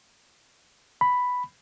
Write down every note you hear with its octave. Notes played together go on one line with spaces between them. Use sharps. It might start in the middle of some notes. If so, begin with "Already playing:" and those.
B5